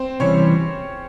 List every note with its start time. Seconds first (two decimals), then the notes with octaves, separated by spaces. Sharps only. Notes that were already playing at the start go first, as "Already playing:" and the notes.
Already playing: C4 C5
0.20 C3 E3 G3 C#4 C#5